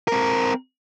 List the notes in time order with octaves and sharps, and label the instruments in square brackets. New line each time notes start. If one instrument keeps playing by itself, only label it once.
[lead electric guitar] C4 A#4